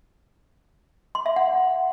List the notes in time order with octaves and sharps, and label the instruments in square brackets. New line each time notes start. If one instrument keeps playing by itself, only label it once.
[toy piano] C6
E5
F#5